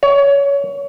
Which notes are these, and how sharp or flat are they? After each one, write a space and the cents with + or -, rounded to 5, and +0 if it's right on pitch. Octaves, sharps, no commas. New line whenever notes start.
C#5 +25